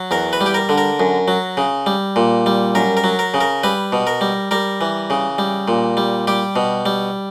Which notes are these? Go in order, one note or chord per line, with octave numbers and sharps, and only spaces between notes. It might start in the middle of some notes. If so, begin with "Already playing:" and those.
Already playing: F#3
E2 A#4
B4
G3
G4
A#4
D3
A#4
F#2
F#3
C#3
G3
A#2
G3
F#2 A#4
A#4
F#3
A#4
C#3
A#4
G3 B4
B2
A#4
G3
G3 A#4
E3
C#3
G3
A#2
G3
G3 G4
B2
G3